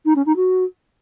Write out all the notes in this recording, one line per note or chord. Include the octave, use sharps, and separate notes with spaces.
D#4
C#4
D#4
F#4